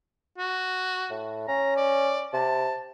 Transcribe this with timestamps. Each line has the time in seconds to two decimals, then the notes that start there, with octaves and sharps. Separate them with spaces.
0.38 F#4
1.10 A2
1.48 C#4 A#5
1.77 D5
2.33 C3 A5